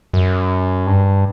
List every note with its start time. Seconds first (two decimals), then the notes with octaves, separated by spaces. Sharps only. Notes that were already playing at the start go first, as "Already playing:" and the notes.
0.14 F#2
0.87 G2